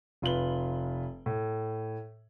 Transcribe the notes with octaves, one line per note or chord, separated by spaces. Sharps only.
F1 F4 B4 F#7 G7
A2